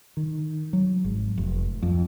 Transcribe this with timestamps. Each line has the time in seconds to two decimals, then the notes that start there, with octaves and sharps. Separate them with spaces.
0.17 D#3
0.73 F#3
1.05 G#1
1.38 F1
1.82 F2